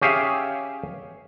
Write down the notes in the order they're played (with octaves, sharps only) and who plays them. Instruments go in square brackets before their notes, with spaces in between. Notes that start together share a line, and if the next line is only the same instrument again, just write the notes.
[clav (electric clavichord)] C#4 G4 G#4 E5 F5